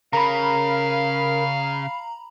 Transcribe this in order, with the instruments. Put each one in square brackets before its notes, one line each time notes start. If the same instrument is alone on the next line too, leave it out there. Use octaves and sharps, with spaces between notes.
[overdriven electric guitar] C#3 [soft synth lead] A#4 [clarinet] F5 [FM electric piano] A#5 B5